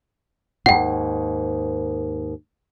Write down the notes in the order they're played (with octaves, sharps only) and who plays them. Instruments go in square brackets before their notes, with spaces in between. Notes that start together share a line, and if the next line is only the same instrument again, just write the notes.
[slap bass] D#2 G#2 [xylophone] F#5 G5